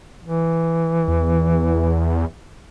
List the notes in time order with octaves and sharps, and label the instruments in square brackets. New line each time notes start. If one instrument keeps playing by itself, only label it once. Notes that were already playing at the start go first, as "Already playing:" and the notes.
[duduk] E3
[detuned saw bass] E2